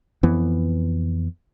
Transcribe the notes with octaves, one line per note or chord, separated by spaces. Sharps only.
F2 E3 B3